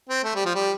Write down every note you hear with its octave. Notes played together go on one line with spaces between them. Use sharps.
C4
A3
G3
F3
G3